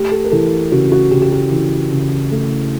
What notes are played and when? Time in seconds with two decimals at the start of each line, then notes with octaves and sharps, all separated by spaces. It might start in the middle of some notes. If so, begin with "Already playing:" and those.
Already playing: A3 G4
0.12 A4
0.24 A#4
0.31 E3 A4
0.72 C#3 F#4
0.92 F#4
1.11 C#3 G4
1.22 G4
1.32 F#4
1.52 E3
1.91 C#3
2.32 A3